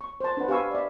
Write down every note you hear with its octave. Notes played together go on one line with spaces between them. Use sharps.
C#6
C5 A5
D4 B4 C5 F#5
G4 B4 F5 G#5 C#6 E6
D5 E5